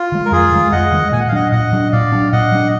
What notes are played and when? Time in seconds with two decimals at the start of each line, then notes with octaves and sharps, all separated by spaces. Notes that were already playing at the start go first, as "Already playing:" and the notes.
Already playing: F4
0.12 D#3 G#3
0.26 A#4
0.32 F2 F4 G#4
0.52 D#3 G#3
0.72 F2 D#5 F#5
0.92 D#3 G#3
1.12 A#2 G#5
1.20 F#5
1.28 F5
1.32 F#3 D4 D#5 F#5
1.52 A#2 D#5 F#5
1.73 F#3 D4
1.92 A#2 D5 F5
2.12 F#3 D4
2.32 A#2 D#5 F#5
2.52 F#3 D4